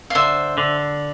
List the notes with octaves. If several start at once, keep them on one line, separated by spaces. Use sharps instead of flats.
F5
D3 C5 E5
D3